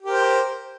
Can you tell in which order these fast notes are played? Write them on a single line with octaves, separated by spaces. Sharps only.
G4 A#4 C5